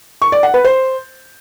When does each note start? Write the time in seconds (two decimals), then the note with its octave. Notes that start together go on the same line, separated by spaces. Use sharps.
0.22 C#6
0.32 D5
0.43 F#5
0.54 B4
0.65 C5